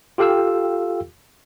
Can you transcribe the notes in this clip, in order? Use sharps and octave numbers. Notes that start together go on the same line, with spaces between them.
F4 G4 A4 F5 G5 E6